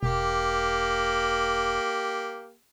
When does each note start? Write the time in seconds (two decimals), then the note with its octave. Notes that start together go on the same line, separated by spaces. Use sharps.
0.03 E1 A#3 G4